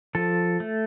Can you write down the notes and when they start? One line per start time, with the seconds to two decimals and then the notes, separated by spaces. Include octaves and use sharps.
0.15 F3 A4
0.60 A3